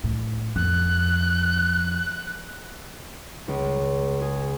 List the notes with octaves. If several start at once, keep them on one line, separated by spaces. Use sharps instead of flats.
A2
F2 F#6
C#2
G#4